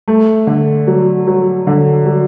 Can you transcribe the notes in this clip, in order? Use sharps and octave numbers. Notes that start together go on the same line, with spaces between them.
A3
D3
F#3
F#3
D3
F#3